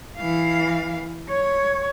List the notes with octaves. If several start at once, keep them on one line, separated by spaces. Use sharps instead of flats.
E3 F5
C#5